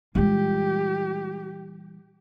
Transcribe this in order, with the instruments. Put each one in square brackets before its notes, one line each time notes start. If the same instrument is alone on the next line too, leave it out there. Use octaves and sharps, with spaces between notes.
[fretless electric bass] A#2 E3 G3 [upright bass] G#3 F4 [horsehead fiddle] G4